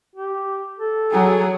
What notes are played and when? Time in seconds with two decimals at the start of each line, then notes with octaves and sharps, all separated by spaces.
0.16 G4
0.79 A4
1.12 F#3 G#4